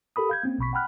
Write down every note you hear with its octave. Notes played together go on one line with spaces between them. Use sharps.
G4 A4 A#4 B5 D#6
F5 G6 G#6
A#3 C4 C#4
A#1 B2 B5 C#6 B6
F#5 G5 B5 F6 F#6